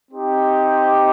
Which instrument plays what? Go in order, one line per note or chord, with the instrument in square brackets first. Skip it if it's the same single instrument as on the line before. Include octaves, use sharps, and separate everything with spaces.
[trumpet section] C4 D#4 G4